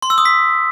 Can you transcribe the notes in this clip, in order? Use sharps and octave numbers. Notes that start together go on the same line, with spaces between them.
C6
E6
D#6
B6